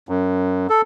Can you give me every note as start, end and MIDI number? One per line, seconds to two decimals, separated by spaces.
0.09 0.67 42
0.70 0.82 69